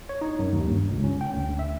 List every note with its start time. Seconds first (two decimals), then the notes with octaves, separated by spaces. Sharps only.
0.09 C#5
0.21 D#4
0.39 F#2
0.52 D#2
0.67 G2
0.91 C#2
1.04 C#4
1.21 G5
1.33 D2
1.59 E5